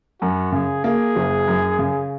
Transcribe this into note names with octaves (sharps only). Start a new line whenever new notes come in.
F#2 F#4
C#3 G#4
A#3 G#4
F#1
F#2
C#3